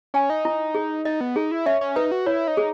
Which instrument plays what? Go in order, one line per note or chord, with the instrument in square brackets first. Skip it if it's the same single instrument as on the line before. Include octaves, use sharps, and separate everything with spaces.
[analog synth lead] C#4 [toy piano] G#5
[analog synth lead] D#4
[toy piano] E4
G#4
[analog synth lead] D#4 [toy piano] D#5
[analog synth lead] B3
[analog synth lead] D#4 [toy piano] G#4
[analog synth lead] E4
[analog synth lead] C#4 [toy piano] E5
[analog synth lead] C#4
[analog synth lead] D#4 [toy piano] B4
[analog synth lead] F#4
[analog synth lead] E4 [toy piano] C#5
[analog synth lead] D#4
[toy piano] G#4